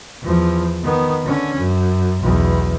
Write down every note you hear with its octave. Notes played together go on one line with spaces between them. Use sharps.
E2 F3
D#3 B3
D3 C#4
F#2
B1 E2